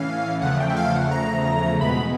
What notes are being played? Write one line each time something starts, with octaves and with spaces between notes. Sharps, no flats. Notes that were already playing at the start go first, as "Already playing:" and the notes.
Already playing: A2 E3 A3 C#4 F5
E2 C#3 F3 A3 F#5
G5
E5
F5
F#5
A#5
E2 B2 G#3 B3 B5